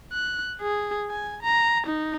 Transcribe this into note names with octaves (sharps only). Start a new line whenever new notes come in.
F#6
G#4
G#5
A#5
D#4